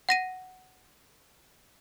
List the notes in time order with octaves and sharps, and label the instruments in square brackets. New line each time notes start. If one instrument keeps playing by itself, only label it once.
[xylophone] F#5 A#6 D#7